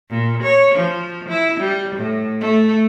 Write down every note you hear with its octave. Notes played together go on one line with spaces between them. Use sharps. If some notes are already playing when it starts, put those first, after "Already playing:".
A#2
C#5
F3
E4
G3
A2
A3